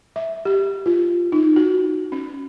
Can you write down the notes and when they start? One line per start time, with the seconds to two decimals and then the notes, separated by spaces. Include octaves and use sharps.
0.16 E5
0.45 G4
0.86 F4
1.32 D#4
1.56 F#4
2.12 C#4